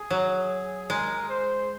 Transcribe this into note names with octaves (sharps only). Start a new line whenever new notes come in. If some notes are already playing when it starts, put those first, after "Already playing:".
Already playing: G#4
F#3
G#3 A#4
C5